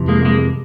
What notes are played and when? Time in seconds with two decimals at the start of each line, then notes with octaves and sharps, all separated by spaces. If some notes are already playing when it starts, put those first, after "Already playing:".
Already playing: F2 C3 E3
0.08 G#3 A#3
0.25 G#3 A#3